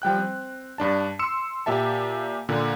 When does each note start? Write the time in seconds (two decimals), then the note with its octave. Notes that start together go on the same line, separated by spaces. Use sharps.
0.02 F3 G3 G5 F#6
0.18 C4
0.78 G2 D4 A5
1.19 C6 E6 C#7 E7
1.66 A#2 G4 E5 A5
2.49 A#2 D3